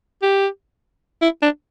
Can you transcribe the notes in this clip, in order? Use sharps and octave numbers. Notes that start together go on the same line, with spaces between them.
G4
E4
D4